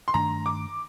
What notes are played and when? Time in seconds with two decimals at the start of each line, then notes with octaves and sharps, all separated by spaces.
0.08 C6
0.14 G2 D#3 A3 D4 A#5
0.46 D6